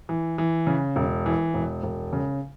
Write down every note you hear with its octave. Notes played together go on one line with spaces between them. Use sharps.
E3
E3
C#3
E1
E3
E1
E1
C#3